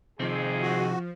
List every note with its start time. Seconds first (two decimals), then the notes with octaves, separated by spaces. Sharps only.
0.19 F2 C3 D#3 F3 G#3 C4 G#4
0.62 F#4